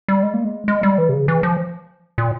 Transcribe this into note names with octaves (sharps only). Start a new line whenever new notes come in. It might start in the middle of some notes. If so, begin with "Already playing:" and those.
G3
G#3
A#3
G#3
G#3
G3
E3
C3
C#3
E3
F3
A#2